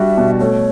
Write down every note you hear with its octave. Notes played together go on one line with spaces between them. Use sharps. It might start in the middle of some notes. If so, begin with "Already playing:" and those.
Already playing: G3 D4 F#4 E5
B2
A3 C#5